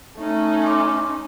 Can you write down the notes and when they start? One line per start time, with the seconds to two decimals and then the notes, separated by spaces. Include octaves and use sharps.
0.19 A3 C#4 D#4
0.66 C6 D6